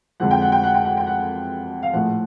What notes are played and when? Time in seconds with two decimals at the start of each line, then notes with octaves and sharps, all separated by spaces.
0.20 F2 D3 F3 G#3 F#5
0.31 G5
0.42 F#5
0.52 G5
0.64 F#5
0.74 G5
0.85 F#5
0.97 G5
1.07 F#5
1.83 F5
1.93 A#1 A2 F3 F#5